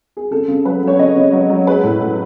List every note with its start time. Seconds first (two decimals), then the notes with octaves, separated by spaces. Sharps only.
0.17 G#4
0.31 C#3 A4
0.48 C#3
0.65 F#3 B4
0.83 F#3 C#5
0.99 C#3 D#5
1.16 C#3
1.32 F#3
1.50 F#3
1.67 G#3 B4
1.83 A2
2.00 A2